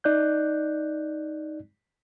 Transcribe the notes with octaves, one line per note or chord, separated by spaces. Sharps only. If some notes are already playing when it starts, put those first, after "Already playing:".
D#4 D5 F#6 G6